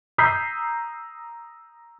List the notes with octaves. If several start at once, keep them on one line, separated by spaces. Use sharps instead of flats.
A#5 D#6 E6 G6 B6 C7